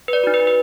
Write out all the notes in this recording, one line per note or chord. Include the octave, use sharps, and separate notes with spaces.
B4
D5
D#4 F#4
B4
B4